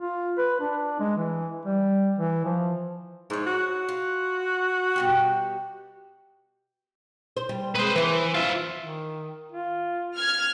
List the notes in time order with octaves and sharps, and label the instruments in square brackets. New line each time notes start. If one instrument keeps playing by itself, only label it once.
[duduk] F4
B4
D4
G#3
E3
G3
E3
F3
[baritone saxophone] G#2 [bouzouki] E4 C#5
[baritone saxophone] F#4
[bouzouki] F4
B2 G3 G4
[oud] C5
G3
[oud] G#3 C4 [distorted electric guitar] B4 C5
[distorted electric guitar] E3 [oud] B4 C5
[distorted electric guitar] F4 E5
[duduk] D#3
F4
[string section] F6 G#6